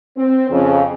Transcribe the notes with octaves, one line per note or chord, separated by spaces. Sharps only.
C4
F2 C#3